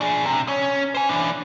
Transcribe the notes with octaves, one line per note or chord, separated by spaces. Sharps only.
D4 G#4
C3
C#4
C5 G#5
E3 D4